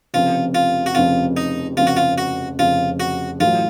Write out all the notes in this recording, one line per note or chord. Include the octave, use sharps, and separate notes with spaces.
F1 F2 C#3 F4
F4
F#4
F1 F2 C#3 F4
D#4
F1 F2 C#3 F4
F#4
F4
F#4
F1 F2 C#3 F4
F#4
A1 A2 F#3 F4